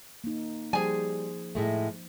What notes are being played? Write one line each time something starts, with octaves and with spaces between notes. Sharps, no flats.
A#3 D#4
F3 G3 G#4 C5 G#5
A2 G#3 A3